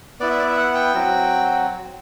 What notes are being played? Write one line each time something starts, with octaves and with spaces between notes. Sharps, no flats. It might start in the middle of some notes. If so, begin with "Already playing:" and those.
B3 E4 D5
E5
D5
E5
F#5
G5
F#3 C4 F#4